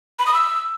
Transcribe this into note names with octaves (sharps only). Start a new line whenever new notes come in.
B5
D#6
E6